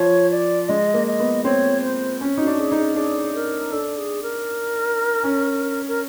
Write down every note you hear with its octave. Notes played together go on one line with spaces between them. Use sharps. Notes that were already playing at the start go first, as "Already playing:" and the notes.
Already playing: F3 C#5
D5
G#3 D#5
A#3
D#5
B3
C4 C#5
C5
C#4
D#4 F#4
D4
G#4
D#4
G#4
D4 G#4
A#4
D4 A4
G#4
A#4
C#4
A#4